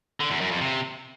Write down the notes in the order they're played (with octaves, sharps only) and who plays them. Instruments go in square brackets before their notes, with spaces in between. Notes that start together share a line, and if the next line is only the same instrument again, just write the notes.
[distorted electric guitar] D3
E2
F#2
F2
C3